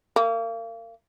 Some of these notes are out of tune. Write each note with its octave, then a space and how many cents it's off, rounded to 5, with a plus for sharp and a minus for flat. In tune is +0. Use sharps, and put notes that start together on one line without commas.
A#3 -35